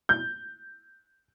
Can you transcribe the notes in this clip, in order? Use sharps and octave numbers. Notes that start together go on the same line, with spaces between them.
G6